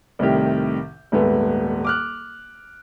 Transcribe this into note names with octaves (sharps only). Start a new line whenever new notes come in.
C2 A2 C3 D#3 G4
D#1 G#2 A3 B3
D6 F6 F#6